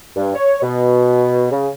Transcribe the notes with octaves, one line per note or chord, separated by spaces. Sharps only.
G2
C#5
B2
C#3